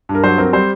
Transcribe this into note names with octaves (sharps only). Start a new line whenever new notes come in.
G2
A#4
F#3 C5
C4 A#4
G3 C5